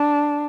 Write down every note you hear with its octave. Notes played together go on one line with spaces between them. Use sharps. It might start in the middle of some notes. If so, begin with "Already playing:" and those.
Already playing: D4